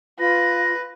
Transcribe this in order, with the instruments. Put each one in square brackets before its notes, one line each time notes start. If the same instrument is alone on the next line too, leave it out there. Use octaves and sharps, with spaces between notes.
[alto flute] F4 [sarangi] B4 [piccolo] A#6